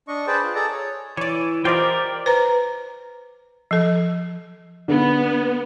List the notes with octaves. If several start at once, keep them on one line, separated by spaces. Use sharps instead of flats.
D4 D#5 C#6
G#4 B4 C5 D5 G5 A5
F4
G#4 A4 D5 D#5 A5 A#5
C#5
E3 C#5 D5
F4 G4 A#4 C5 D5 D#5 G5
B4 C5 A#5
F3 A4
D3 B3